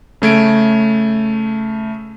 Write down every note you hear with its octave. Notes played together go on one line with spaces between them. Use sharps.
C#3 A3 G#6 D7